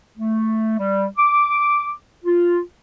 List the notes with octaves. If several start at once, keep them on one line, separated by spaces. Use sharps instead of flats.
A3
G3
D6
F4